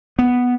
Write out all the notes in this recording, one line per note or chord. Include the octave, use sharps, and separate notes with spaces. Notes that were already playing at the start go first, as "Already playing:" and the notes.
B3